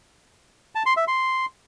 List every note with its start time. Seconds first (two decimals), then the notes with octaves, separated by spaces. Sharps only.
0.75 A5
0.86 C6
0.97 E5
1.08 C6